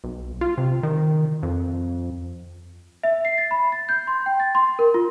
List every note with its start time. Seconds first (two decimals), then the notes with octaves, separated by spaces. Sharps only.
0.04 B1
0.41 F4
0.58 C3
0.83 D#3
1.43 F2
3.03 E5
3.25 C7
3.38 A6
3.51 B5
3.72 A6
3.89 G6
4.07 C6
4.26 G5
4.40 A6
4.55 C6
4.79 A#4
4.94 F4